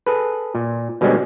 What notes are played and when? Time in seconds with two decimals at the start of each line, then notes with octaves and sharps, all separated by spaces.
0.06 G#4 A4 B4
0.55 A#2
1.01 B2 D3 G3 G#3 C4 C#4